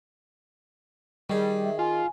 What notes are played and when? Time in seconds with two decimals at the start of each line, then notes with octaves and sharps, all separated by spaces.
1.30 D#3 G3 G#4
1.63 E5
1.79 F4 G#5